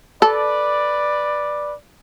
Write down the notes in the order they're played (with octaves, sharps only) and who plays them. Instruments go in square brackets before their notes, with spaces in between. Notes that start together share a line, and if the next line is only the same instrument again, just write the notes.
[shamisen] A4 [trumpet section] B4 D5